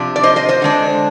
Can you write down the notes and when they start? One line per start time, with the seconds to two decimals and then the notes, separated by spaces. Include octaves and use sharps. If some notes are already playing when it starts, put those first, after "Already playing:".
Already playing: C3 F3 D4
0.16 D5
0.23 C5 D#5
0.36 C5 D#5
0.49 C5 D#5
0.62 D3 G#3 D4